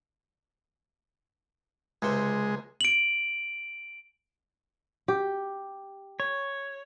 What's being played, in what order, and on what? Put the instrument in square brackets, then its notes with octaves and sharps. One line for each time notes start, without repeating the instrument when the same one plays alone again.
[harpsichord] C#2 C3 C5 [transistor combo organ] G#3
[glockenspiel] D7 F#7
[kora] G4
[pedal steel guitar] C#5